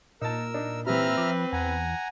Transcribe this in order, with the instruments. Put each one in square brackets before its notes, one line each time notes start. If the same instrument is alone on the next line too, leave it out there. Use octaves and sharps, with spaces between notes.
[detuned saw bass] A#2 [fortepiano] D#4 A5 [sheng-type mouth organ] A#4 E6
[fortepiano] D4 D#4
[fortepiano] C3 E3 [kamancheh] C4 B4 [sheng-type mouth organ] E5 A#5 F6
[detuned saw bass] F3 [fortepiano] D6
[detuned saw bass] E2 [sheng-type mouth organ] F#5 G#5 A#5